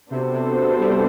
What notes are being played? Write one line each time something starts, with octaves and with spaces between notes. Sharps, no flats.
C3 B3 D4 F#4 A4 C5
C3
G3